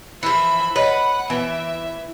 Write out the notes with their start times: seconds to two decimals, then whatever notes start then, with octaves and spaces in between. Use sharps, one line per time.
0.23 E3 F3 E5 B5
0.76 B4 C#5 D#5 F#5
1.30 E3 B3 B4 E5